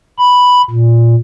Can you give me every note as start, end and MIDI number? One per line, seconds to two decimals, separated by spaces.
0.18 0.62 83
0.70 1.15 46